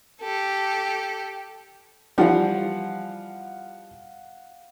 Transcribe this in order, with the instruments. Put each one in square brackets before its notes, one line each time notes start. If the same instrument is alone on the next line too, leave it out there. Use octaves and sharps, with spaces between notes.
[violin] G4 A4
[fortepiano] E3 F3 G3 [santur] F5 F#5